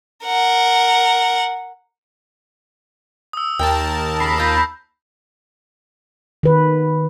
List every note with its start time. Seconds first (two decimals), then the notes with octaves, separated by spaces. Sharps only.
0.25 A#4 F#5
3.33 D#6 E6
3.59 D#2 A#4 G5 A5
4.20 C#3 B5 A#6 C7
4.38 A#3 F4 D#6 G6 A#6
6.43 D#3 B4